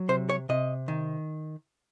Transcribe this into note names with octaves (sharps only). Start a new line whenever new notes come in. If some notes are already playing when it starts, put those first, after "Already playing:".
Already playing: F#3
C3 C5
C#5
C3 D#5
D#3